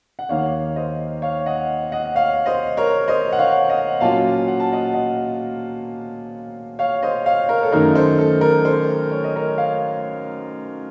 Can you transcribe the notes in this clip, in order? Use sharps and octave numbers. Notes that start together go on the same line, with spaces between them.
F#5
D#2 D#3 A#3 C#5 F5
C5 D#5
C#5 F5
D#5 F#5
D#5 F#5
C#5 F5
C5 D#5
A#4 C#5
C5 D#5
F#5
C#5 F5
D#5 F#5
A#2 F#3 A#3 C#4 F4 F5 A5
F#5
A5
D#5 F#5
D#5 F#5
C#5 F5
C5 D#5
C#5 F5
A#4 C#5
A4
F#2 D#3 A3 D#4 A#4
A4 C5
A4
A#4
A4 C5
C#5
D#5
A#4 C#5
C#5 F5